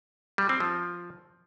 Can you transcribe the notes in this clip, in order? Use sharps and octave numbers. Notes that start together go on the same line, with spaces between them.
G3
C4
F3